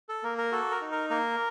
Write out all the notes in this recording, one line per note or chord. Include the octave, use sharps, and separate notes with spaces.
A4
A#3 A#4
A#4
F#4 A4
A#4
D#4
A#4
A#3 A#4